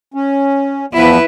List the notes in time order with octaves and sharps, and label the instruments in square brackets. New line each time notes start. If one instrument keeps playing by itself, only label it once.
[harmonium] C#4
[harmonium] E2 F3 B3 [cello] E4 B4